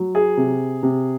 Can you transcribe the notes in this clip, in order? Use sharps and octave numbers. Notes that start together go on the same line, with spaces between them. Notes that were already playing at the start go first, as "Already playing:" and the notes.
Already playing: F#3
G#4
C3
C3